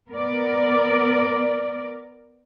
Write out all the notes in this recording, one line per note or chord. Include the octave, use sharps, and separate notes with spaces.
B3 A#4 D5